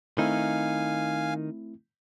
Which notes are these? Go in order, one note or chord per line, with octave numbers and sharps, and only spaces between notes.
D#3 A3 C4 D#4 E4 F5 G#5